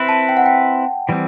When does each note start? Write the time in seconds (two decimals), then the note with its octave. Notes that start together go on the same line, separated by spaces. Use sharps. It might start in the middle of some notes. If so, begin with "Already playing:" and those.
Already playing: C4 E4 B4
0.09 A5
0.29 G5
0.37 F#5
0.46 G5
1.09 E3 G3 C4